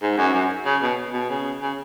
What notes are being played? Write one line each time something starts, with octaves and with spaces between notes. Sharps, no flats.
G#2
F#2
F#2
C#3
B2
B2
C#3
C#3